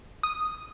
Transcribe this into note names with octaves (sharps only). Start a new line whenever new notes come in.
D#6